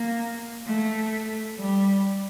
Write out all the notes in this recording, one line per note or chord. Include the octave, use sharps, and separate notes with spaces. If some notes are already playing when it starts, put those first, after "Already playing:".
Already playing: A#3
A3
G3